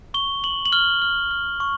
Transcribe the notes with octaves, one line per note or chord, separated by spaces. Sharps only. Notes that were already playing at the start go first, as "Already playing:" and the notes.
C#6 G7
C#6 F#7
F#7
F6 G7
F6
F6
C#6